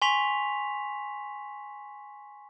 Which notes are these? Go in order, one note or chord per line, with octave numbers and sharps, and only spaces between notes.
G#5 C6 C#6 B6 F7